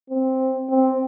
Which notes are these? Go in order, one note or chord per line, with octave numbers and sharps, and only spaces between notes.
C4
C4